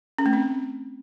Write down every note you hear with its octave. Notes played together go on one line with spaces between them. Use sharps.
C#4
A3
C4